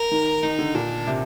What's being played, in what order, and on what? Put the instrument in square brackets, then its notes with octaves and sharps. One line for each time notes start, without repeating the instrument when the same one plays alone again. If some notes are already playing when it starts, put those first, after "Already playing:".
Already playing: [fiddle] A#4
[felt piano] D#3
[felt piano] D#3 [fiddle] D#4
[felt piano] D3
[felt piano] A#2 [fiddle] D4
[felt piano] C3